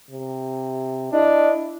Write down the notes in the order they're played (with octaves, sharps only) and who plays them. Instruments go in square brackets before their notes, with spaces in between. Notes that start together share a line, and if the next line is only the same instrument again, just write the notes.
[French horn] C3
[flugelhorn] D4 [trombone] E4 [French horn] D#5